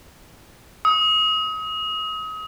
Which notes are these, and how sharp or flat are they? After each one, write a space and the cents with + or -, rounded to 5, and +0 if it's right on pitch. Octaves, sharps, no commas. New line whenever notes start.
D#6 +35